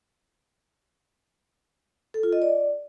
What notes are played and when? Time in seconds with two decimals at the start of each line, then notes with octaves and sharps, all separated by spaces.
2.14 A4
2.23 F4
2.33 D#5
2.42 D5